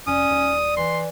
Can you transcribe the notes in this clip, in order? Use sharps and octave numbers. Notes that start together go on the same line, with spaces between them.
F1 C#4 D5 D#6
D#1
E3 C6